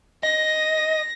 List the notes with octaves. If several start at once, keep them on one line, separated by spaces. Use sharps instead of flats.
D#5 A#6